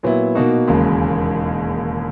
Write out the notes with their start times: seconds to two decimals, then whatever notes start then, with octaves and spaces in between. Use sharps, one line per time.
0.03 A#2 F#3 B3 E4
0.35 B2 A#3 D#4 F#4
0.67 E1 D#2 C#3 G#3